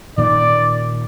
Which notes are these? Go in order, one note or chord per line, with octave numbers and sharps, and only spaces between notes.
A#2 D#3 D5